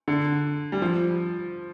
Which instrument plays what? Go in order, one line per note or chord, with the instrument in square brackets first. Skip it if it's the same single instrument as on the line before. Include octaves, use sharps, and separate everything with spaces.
[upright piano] D3
G3
F3